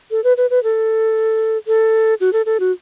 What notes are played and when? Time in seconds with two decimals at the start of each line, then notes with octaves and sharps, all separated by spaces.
0.11 A4
0.24 B4
0.37 B4
0.50 B4
0.64 A4
1.67 A4
2.21 F#4
2.33 A4
2.46 A4
2.60 F#4